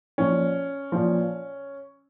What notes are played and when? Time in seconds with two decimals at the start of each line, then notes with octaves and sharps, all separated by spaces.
0.18 A#2 F3 C#4
0.92 A#2 F3